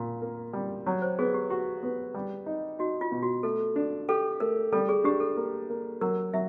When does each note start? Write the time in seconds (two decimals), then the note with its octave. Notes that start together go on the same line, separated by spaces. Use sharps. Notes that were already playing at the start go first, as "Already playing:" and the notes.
Already playing: A#2
0.22 A#3
0.53 G3
0.86 F#3 C#5
1.02 C5
1.19 B3 G#4
1.34 G4
1.50 F#4 G4
1.83 B3
2.14 G3
2.46 D#4
2.79 D#4 F#4
3.01 F4
3.12 B2
3.23 F#4
3.43 A3 A4
3.76 D4
4.09 G4 A4
4.40 A3 A#4
4.72 G3 A4
4.89 G#4
5.04 D4 G4
5.20 A4
5.36 A#3
5.70 A#3
6.01 F#3 A#4
6.34 F#3 E5